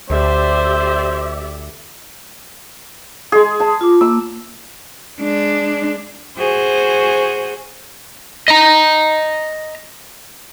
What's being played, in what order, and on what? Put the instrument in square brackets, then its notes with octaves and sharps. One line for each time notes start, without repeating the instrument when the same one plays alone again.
[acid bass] D2 [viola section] G4 D5 E5 [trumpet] C5
[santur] G#3 G#4
A5
[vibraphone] F4 D6
[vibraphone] A#3 [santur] E6
[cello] G#3 D4
[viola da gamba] F#4 G#4 C5
[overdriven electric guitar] D#5 A#5